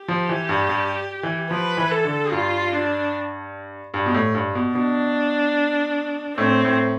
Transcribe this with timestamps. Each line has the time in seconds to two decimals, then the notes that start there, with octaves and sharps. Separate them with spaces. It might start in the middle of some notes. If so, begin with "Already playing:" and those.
Already playing: G4
0.08 F3
0.29 E3
0.49 G2
0.69 G2
1.23 E3
1.51 F3 B4
1.77 E3
1.91 A4
2.05 D3
2.31 G2 F4
2.73 D4
3.94 G2
4.06 B2
4.14 A2
4.35 G2
4.55 B2
4.75 B2 D4
6.37 A2 C4
6.65 A2